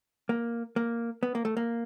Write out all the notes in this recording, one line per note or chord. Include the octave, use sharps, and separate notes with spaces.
A#3
A#3
B3
A#3
A3
A#3